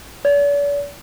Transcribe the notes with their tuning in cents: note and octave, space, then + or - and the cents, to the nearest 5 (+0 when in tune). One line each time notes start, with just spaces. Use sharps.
D5 -45